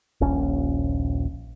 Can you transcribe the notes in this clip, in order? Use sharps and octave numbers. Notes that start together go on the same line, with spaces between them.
D#1 A#1 C#4